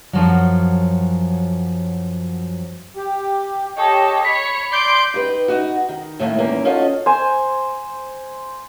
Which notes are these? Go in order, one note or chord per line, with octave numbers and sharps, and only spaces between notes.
F#2 F3 F#3
G4
G4 A4 C#5 D#5
C#5 B5 B6
D5 C6 G6 D7
D#4 G4 B4
D#4 F#4
D#3
A2 D#3 A3 A#3
E2 D#3 A#3 C#4
C#4 D#4 F4 F#4 A4 D#5
C5 G#5